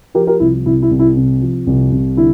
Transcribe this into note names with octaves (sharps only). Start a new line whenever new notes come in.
F3 G4 A#4
G4 A#4
C2 E4
C2 E4
E4
C2
E4
C3
F3
C2
C2
D3 E4